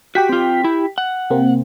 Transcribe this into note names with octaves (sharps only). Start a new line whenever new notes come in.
F#4 G4 G5 B6
C4 F4
E4
F#5
C3 A#3 C4